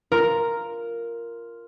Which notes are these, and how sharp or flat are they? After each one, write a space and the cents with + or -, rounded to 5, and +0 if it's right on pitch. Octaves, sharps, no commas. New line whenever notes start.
F4 -10 A#4 +0